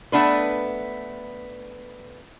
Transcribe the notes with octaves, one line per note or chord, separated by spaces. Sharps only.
A3 B3 D4 B4